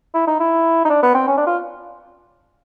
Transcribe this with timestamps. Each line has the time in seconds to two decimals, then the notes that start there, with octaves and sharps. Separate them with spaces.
0.14 E4
0.27 D#4
0.40 E4
0.85 D#4
0.90 D4
1.03 B3
1.15 C4
1.28 C#4
1.37 D4
1.47 F4